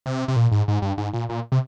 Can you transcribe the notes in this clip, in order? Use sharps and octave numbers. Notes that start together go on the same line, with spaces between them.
C3
C3
A#2
G#2
G#2
G2
G#2
A#2
A#2
C3